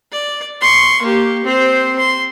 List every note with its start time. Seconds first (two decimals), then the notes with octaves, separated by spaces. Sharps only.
0.12 D5
0.61 C6 C#6
1.02 A#3 G4
1.44 C4 C5
1.99 C6